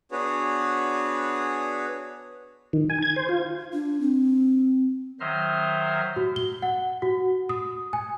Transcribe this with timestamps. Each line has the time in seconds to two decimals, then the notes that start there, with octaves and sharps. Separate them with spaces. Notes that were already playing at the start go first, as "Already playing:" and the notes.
0.12 B3 D4 F#4 G#4 B4 C#5
2.73 D#3
2.90 G#5
3.03 G#6
3.16 C5
3.29 F4
3.73 D4
4.01 C4
5.20 D#3 F#3 C5 D#5 E5 F6
6.16 F#4
6.36 G7
6.62 F#5
7.02 F#4
7.49 D#6
7.93 G#5